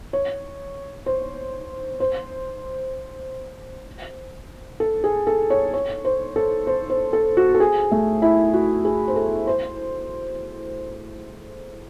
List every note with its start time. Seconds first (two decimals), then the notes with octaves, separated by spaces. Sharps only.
0.13 C#5
1.06 C5
2.00 C5
4.80 A4
5.04 G#4
5.27 A4
5.50 C#5
5.73 C#5
6.05 C5
6.36 A4
6.67 C5
6.90 C5
7.13 A4
7.37 F#4
7.54 A4
7.60 G#4
7.92 A3
8.22 E4
8.53 F#4
8.85 G#4
9.08 C5
9.16 A4
9.47 C5